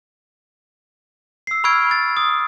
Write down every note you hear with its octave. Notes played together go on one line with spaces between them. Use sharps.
E6 C7
B5 C#6 E6 F6 G#6 D7
B5 A6
D#6